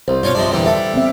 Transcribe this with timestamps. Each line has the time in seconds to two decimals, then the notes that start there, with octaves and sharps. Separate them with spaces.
0.08 C2 C5
0.23 G2 B2 F4 C#5 F5
0.35 G2 C3 F3 G#3 D4
0.52 E2 A#2 D3 E3 G3 G4
0.66 A4 E5
0.94 B3 C4 E5